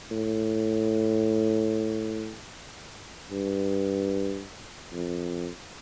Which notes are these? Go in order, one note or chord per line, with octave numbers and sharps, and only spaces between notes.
A2
G2
F2